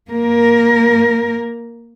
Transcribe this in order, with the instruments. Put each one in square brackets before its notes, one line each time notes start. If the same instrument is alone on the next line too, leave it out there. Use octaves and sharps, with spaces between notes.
[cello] A#3 A#4